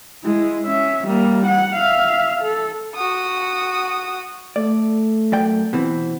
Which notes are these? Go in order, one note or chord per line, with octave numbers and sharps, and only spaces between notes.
G#3 E4
C#4 E5
G3 A#3
F#5
E5 F5
A4
F#4 D#6
A3 D5
F#2 D5 G5
B2 E3 C4